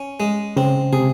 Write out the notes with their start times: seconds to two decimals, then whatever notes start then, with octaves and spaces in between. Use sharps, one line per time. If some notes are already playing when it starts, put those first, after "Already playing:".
Already playing: C#4
0.20 G#3
0.56 C#3 C4
0.93 C3 G#4